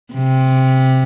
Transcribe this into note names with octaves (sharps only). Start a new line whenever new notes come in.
C3